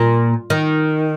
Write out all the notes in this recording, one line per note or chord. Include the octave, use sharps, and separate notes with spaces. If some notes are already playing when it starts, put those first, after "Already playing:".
Already playing: A#2
D#3